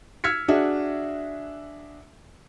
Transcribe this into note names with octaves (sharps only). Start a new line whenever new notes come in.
E6 F6 G#6 B6 C#7
D4 F#4 G#4 E5